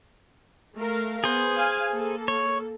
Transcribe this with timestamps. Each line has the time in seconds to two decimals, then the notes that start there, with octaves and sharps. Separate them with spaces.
0.76 A3 A#4 F5
1.24 B3 G#4 C5
1.56 F5 G#5
1.92 A#3 A4
2.28 C#5